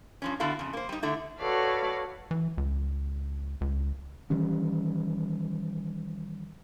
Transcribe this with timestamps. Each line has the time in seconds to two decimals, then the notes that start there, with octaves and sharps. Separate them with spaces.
0.22 G2 F3 C#4
0.40 D3 B3 E4 F#4 A4 F5
0.59 F2 C#3
0.73 A#3 C5
0.89 G3 D#4
1.02 D3 A3 E4
1.39 F#4 A4 B4 C#5 D5 F5
2.31 E3
2.57 C#2
3.61 C#2
4.30 D#3 E3 G3 C#4